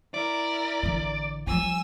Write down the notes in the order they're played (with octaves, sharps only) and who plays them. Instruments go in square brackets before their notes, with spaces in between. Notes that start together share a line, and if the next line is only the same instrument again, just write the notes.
[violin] E4 A#4 [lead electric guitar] D5
[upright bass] A1 D3
[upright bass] F3 G3 [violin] G#5 E6